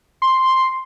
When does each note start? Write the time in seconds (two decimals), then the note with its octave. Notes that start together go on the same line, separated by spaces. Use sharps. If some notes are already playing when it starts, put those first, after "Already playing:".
0.22 C6